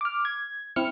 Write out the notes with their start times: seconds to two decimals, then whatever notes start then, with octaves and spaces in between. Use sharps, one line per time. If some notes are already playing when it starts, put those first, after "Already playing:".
0.01 D6 F6
0.25 G#6
0.76 C4 E4 F6 C#7